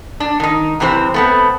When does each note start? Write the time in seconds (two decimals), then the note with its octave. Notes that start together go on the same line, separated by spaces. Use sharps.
0.20 D4
0.40 D#3 D#4
0.80 F#2 C3 E3 C4 C5
1.14 A3 B3 C4